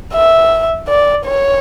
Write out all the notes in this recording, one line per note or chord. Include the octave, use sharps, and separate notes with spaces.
E5
D5
C#5